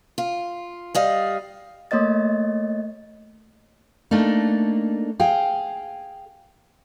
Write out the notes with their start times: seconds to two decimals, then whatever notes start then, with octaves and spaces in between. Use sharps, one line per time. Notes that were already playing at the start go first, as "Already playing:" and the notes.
0.18 F4
0.95 G3 D#5 F5
1.91 A3 A#3 C#5 D#5 A6
4.11 A3 A#3 D4 D#4
5.20 G#4 F5 G5